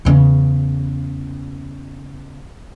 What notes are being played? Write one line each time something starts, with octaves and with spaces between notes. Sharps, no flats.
E2 C#3